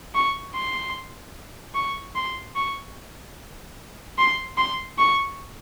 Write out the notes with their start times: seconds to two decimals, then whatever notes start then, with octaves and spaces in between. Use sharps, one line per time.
0.15 C#6
0.55 C6
1.75 C#6
2.16 C6
2.56 C#6
4.18 C6
4.58 C6
4.99 C#6